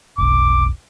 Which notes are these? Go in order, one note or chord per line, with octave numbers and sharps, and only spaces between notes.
F1 B1 D6